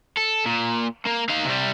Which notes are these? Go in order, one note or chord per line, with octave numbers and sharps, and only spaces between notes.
A4
A#2
A#3
D#4 F5
C3 G3